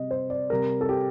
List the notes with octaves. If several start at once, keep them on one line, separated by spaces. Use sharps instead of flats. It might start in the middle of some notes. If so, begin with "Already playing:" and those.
Already playing: C3 G3 D#5
C5
D5
C3 G3 A#4
A4
G4